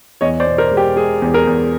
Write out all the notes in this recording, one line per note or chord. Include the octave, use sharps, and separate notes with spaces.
E2 C#5 D#5
C5 D5
B2
A#4 C5
G#3
G4
G#3 G#4
E2
G#4 A#4
E2